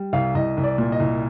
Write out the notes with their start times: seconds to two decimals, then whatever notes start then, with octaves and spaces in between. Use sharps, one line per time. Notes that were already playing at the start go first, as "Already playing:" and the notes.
Already playing: G3
0.13 C2 F5
0.35 C2 D#5
0.57 C2
0.64 D5
0.78 A#2
0.92 D#5
1.00 C2